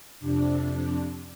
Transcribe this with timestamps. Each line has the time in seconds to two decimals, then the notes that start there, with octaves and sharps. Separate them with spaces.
0.20 F2 C3 D4